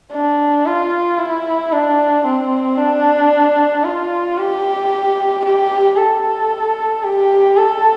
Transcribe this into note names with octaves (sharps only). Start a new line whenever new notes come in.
D4
F4
E4
D4
C4
D4
F4
G4
G4
A4
G4
A4